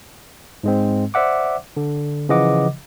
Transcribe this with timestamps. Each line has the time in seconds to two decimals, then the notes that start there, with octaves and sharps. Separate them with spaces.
0.64 G#2 G#3 C4
1.14 C5 D5 E5 F#5 D6
1.77 D3
2.29 C#3 E3 F3 D#5 F#5 D6